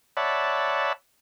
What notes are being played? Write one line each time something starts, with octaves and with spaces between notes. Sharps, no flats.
C#5 D5 E5 F#5 A5 B5